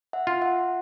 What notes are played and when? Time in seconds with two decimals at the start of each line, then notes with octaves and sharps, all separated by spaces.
0.13 E5 F#5
0.27 F4
0.41 E5 F#5